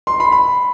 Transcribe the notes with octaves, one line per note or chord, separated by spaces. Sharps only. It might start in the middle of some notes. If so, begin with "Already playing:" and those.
C6
B5
B5